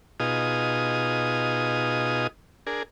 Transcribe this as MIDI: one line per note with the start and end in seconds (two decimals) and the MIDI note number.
0.20 2.27 47
0.20 2.27 63
0.20 2.27 65
0.20 2.27 68
0.20 2.27 87
2.67 2.83 62
2.67 2.83 68
2.67 2.83 70